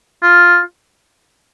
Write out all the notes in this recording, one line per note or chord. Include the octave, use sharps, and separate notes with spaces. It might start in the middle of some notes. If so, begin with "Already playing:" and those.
F4